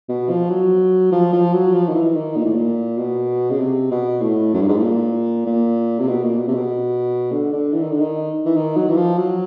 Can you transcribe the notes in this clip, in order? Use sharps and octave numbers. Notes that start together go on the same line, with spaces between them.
B2
F3
F#3
F3
F3
F#3
F3
D#3
E3
D#3
A#2
A2
A#2
B2
C#3
C3
B2
A2
F#2
G2
G#2
A2
A#2
A#2
C3
B2
A#2
B2
C3
B2
D3
D3
E3
D#3
D3
D#3
E3
D#3
F#3
E3
F3
F#3